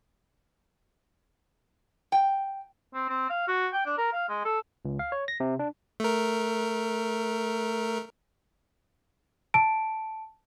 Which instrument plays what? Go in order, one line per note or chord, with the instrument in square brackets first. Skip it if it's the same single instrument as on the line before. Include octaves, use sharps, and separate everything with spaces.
[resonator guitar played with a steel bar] G5
[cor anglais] C4
C4
F5
F#4
G5
D4
A#4
F5
G#3
A4
[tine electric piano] C#2
F5
C#5
A#6
C3
D4
[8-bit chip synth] A3 A#4
[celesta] A5 D7